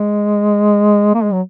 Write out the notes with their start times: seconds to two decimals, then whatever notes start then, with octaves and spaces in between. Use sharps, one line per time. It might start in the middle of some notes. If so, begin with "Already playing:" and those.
Already playing: G#3
1.14 A#3
1.23 G#3
1.33 F#3